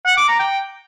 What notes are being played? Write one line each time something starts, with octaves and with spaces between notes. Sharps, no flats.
F#5
D6
A#5
G5